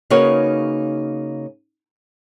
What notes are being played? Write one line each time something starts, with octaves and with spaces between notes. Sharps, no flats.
C#3 A#3 D#4 F#4 B4 C#5